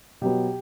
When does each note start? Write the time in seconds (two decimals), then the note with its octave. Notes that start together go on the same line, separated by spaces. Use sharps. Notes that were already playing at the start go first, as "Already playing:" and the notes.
0.21 B2 F#3 B3 G4